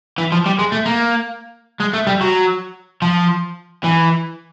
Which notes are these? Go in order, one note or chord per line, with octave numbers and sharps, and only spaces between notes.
E3
F3
G3
G#3
A3
A#3
G#3
A3
G3
F#3
F3
E3